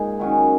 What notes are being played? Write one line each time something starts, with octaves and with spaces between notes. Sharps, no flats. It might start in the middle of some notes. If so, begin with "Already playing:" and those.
Already playing: A#2 G#3 D#4 G#4
D#3 F#3 C#4